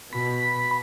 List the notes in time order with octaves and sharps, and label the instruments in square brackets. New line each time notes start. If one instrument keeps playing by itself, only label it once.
[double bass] B2 [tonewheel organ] B5